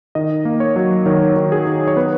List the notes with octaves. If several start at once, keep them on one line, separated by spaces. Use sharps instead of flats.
D#3 D#5
A#3
C#5
F#3
D#3 C#5
D#3
G#4
D#3
C#5
B3 B4